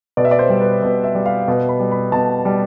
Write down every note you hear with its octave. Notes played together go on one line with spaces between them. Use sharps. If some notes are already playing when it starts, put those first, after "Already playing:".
B2 D5
E5
D5
C5
G3
B4
B2
E5
G3
F5
B2
B5
G3
B5
B2 A5
G3